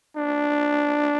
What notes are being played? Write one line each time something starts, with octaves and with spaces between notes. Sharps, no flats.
D4